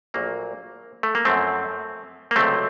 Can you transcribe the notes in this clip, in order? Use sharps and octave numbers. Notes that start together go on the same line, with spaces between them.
A#1 A#2 F#3 A3 A#3
A3
A#3
F#2 F3 A3 C4
A#3
C#2 C3 F#3 A3 C4